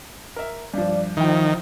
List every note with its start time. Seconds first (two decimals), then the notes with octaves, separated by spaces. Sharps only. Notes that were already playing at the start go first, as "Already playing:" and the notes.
0.36 A#4 E5
0.74 G2 F3 D5
1.17 D#3 F3 E4 G5